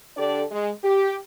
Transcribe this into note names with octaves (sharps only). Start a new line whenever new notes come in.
D3 D4 G4 A4 D5
G#3
G4